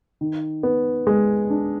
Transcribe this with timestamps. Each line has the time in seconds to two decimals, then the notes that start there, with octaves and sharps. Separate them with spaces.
0.21 D#3
0.63 B3
1.07 G#3
1.50 D4